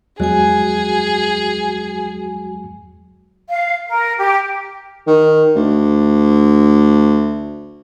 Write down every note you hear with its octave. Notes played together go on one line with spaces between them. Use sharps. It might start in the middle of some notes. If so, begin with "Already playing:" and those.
E2 F#3 G#3 F#4 G#4 G#5
F5
A#4
G4
D#3
D2